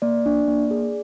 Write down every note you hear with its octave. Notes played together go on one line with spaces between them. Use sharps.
A#3 D5
D4
A#3
G#4